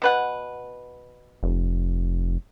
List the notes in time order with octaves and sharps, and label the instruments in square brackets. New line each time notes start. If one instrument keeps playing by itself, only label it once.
[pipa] B2 B4 F#5
[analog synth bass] F1